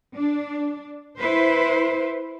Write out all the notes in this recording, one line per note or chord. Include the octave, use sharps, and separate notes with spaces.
D4
E4 B4 C5